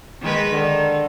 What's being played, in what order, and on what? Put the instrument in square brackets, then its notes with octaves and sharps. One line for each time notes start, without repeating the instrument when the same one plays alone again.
[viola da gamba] D#3 G#3 B4
[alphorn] D3 [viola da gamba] D#3